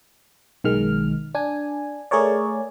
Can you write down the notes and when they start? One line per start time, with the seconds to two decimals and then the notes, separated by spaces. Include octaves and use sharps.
0.64 B1 D#3 G#3 F6
1.35 D4 G#5
2.11 A3 G#4 A#4 C#5 D5